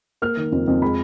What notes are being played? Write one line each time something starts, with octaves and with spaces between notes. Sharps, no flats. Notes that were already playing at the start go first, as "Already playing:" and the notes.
A#3 F6
D#3
F2
F2
G#3 B5